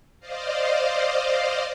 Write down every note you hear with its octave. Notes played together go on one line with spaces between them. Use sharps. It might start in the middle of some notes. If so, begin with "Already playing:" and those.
C5 D5 D#5 F5